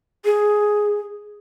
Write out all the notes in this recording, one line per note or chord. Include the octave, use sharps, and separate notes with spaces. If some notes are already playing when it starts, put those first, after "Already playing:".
G#4